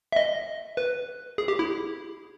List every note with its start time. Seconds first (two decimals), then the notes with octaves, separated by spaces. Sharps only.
0.12 E5
0.16 D#5
0.77 B4
1.38 G#4
1.48 G4
1.59 E4